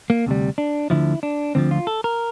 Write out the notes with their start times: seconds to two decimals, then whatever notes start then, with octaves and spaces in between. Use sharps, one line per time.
0.10 A#3
0.26 D2 C3 G3
0.58 D4
0.90 D2 D3 F3 E4
1.23 D4
1.55 D2 D3 F3 C4
1.71 F4
1.87 A4
2.04 A#4